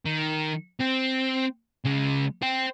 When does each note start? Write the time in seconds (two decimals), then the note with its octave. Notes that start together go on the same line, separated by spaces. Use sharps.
0.06 D#3
0.80 C4
1.85 C#3 G#3
2.42 C5 G5